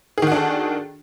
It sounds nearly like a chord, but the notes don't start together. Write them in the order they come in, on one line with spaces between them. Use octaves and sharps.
G#4 D#3 F#4 D4 A4